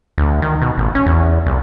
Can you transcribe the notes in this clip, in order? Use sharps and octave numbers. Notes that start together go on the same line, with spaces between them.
D2
D#3
B2
A1
C#4
E2
C2